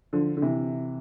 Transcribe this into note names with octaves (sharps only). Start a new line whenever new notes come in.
D3 F3
D3
C3 E3